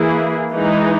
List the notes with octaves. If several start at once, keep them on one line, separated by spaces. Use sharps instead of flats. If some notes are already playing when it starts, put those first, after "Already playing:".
Already playing: E3 A#3 E4 G#4
E3 G#3 D#4